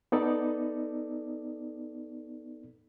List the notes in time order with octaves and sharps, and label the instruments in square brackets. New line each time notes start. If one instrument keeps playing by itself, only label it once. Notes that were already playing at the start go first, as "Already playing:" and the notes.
[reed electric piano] B3 D#4 A4 D5